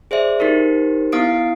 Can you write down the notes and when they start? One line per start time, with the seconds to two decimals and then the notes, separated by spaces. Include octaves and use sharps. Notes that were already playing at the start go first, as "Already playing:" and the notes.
0.11 G#4 C5 D5 E5
0.39 D#4 G4 A#4 C5
1.12 B3 E4 F5 D#6 C7 D7